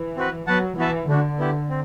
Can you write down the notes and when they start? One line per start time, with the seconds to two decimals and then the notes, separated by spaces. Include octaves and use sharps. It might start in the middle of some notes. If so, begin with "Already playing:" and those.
Already playing: E3
0.16 C4 F#4 B4
0.47 F#3 B3 F#4 B4 F#5 A5
0.77 E3 B3 F#4 B4 E5 A5
1.08 D3 A3 D4 F#4
1.39 B3 E4 G4
1.69 C4